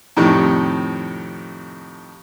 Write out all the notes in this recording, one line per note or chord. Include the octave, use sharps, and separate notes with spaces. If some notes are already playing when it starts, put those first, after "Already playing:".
F2 A2 C3 D#3